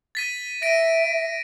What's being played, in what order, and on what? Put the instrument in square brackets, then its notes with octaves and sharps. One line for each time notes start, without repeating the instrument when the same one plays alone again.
[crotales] A6 B6 D#7
[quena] E5 [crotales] A#6 D7 D#7